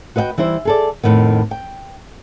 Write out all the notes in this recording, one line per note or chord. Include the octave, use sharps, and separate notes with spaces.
F#4 B4 D#5 F5 G5
E3 G3 E4 C5
G#4 A4 D5
F2 A2 D#3 B3
G5